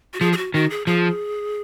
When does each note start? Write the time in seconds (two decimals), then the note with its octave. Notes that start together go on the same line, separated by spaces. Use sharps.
0.14 F#4
0.20 F3 G#4
0.33 G#4
0.37 F#4
0.54 D#3 F#4
0.70 G#4
0.87 F3 G#4